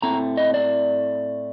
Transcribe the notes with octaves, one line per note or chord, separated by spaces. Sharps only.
A2 A3 C4 A#5
D#5
D5